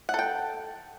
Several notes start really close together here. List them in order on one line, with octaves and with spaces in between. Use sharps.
F#5 A4 G5